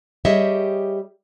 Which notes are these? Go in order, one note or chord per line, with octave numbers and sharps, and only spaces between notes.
G3 G4 G#4 C#5 D#5 E5